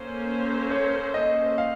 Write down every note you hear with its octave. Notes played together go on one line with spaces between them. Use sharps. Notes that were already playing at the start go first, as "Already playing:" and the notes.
Already playing: A#3 C#4 A4 C5
C#5
D#5
F5